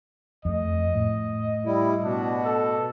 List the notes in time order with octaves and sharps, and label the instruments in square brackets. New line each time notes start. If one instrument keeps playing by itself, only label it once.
[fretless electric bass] F2 A3 [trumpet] D#5
[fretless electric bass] A2
[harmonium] G3 E4
[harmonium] B2 [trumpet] D4
[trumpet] A4